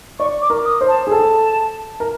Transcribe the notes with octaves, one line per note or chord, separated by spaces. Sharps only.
D5 C#6
D6
A#4
D#6
C5
A5
G#4
A4 A5
A#4